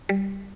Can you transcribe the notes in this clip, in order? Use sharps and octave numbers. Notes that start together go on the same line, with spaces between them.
G3